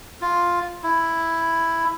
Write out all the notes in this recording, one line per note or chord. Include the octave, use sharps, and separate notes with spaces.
F4
E4